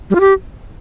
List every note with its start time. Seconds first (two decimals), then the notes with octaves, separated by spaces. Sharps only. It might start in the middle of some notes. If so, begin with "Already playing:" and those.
0.10 G3
0.15 F4
0.20 G4